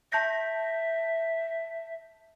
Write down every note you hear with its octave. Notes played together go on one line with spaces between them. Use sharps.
E5 A5 G6 A#6